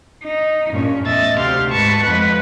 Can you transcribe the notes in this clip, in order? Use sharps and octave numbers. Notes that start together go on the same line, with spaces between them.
D#4
G2 A#2 C#4
E2 A2 D#5 E5 A6
D2 C3 G4 F5 C6 F6
G#2 B4 A5 C#6
F2 G#3 B4 F#5